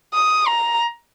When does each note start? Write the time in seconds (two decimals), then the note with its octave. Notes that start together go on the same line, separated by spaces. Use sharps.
0.14 D#6
0.47 A#5